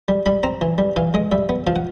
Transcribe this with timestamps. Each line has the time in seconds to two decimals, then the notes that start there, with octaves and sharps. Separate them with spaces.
0.08 G3
0.26 G3 B5
0.43 C4 A#5
0.61 E3
0.78 G3
0.96 E3 F5
1.14 G#3 D#5
1.32 G3 E5
1.49 B3
1.67 F3 F5
1.76 F#5